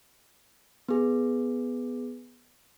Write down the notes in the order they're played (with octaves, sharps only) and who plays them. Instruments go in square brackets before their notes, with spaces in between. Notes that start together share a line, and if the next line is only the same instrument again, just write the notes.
[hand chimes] B3 G#4